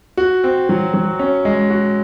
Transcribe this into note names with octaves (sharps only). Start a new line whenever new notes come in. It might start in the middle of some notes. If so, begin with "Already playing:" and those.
F#4
C4
F#3
F#3
C#4
G#3
F#4